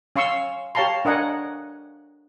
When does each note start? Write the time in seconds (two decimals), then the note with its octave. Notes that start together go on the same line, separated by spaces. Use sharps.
0.16 C#4 F5 C6 C#6 E6
0.75 G4 C#5 F5 A5 A#5 C6
1.05 D4 A#4 D#5 F#5 G#5